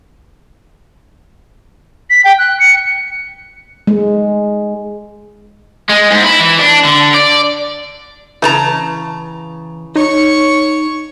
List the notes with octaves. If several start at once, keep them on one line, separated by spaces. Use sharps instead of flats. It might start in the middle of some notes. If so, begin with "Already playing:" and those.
B6
G5
F#6
C#7
G#3
G#3
G#2
E4
E3
D4
D3
D5
C#3 E3 A5 A#5
D#4 C#5 C#6